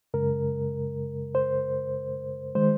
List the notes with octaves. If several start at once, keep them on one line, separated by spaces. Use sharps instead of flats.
F#2 C#3 G#3 A#4
C5
D#3 G#3 C5